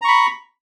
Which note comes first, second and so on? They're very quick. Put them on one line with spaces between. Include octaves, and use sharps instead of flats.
A#5 C#6 B5